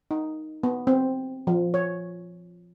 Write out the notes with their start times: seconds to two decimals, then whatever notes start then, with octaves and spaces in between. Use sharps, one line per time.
0.11 D#4
0.63 B3
0.87 C4
1.47 F3
1.74 C#5